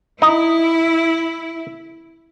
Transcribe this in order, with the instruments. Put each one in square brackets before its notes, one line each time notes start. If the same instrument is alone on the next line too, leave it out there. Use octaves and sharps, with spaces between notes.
[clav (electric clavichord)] D#4 [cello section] E4